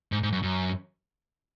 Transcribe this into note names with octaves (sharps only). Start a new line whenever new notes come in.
G#2
G#2
F#2
F#2